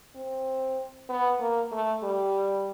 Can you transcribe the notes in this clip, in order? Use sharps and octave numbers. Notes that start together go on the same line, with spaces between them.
C4
B3
A#3
A3
G3